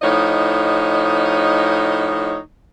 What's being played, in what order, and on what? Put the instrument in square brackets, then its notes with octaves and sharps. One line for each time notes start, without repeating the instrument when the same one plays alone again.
[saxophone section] A2 F3 D#4 C#5 D#5